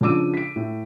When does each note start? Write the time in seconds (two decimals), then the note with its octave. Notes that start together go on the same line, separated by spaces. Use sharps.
0.01 C#3 F3 D4 D6 E6 D#7
0.34 B6 D7
0.56 A2